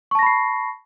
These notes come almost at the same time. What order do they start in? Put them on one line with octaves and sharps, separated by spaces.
C#6 A5 A#6 B5 C7